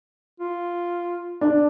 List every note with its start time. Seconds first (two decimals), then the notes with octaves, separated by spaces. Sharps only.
0.40 F4
1.41 D4